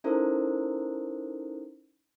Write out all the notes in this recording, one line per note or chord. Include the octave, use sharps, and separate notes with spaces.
C#4 D#4 E4 A4 A#4 C5